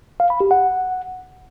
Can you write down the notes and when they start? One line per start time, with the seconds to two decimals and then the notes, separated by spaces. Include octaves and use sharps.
0.20 F5
0.30 B5
0.40 G4
0.51 F#5